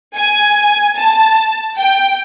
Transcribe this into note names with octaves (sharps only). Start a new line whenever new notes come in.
G#5
A5
G5